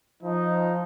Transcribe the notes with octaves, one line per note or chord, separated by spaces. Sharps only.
F3 D#4